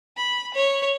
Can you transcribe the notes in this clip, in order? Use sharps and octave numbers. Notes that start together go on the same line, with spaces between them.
B5
C#5